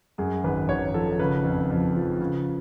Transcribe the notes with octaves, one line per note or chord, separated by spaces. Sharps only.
F#2 G#4
G#1 B4
G#1 C#5
F3 A4
C#3 B4
F2
F2
F3
C#3